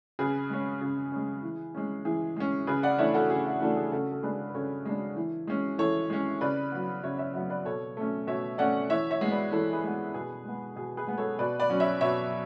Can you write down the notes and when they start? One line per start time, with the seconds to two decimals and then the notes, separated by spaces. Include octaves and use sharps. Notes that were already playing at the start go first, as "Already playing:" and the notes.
0.19 C#3 G#4 B4
0.50 G#3 C#4
0.81 C#3
1.12 G#3 C#4
1.43 E3
1.75 G#3 C#4
2.05 E3 G#4
2.36 G#3 C#4
2.67 C#3 G#4 B4
2.83 D5 F#5
2.98 E3 A3 D4 C#5 E5
3.14 F#4 A4
3.30 C#3 G#4
3.46 F#4
3.61 E3 A3 D4 F#4
3.77 G#4
3.92 C#3 F#4 A4
4.12 A4
4.23 G#3 D4 G#4 B4
4.49 B4
4.54 C#3 A4 C#5
4.85 G#3 D4
5.16 E3
5.47 G#3 C#4
5.78 E3 A4 C#5
6.10 G#3 C#4
6.41 C#3 B4 D5
6.72 F#3 B3
7.03 C#3 C#5 E5
7.18 C#5 E5
7.34 F#3 B3 C#5 E5
7.50 B4 D5
7.65 B2 A4 C#5
7.97 A3 C#4
8.27 B2 C#5 E5
8.58 A3 C#4 D5 F#5
8.90 E3 C#5 E5
9.11 C#5 E5
9.21 G#3 B3
9.31 B4 D5
9.52 E3 A4 C#5
9.73 G#4 B4
9.83 G#3 B3
10.14 B2 G#4 B4
10.45 G#3 B3
10.76 B2 G#4
10.97 G#4 B4
11.07 G#3 B3
11.18 A4 C#5
11.39 B2 B4 D5
11.60 B4 D5
11.69 F#3 C#4
11.80 C#5 E5
12.01 B2 C#5 E5